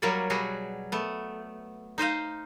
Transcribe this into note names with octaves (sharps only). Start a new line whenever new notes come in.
F#3 G3 A#3 A#4 C#5 D5
B2 F#3 G3 F#4 G#4
A3 B3
D#4 C5 D#5 F5